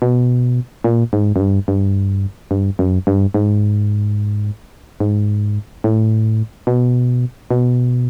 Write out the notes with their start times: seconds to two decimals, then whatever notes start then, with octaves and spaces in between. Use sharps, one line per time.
0.02 B2
0.84 A#2
1.13 G#2
1.36 F#2
1.40 G2
1.68 G2
2.51 G2
2.79 F#2
3.07 G2
3.34 G#2
5.00 G#2
5.84 A2
6.67 B2
7.51 B2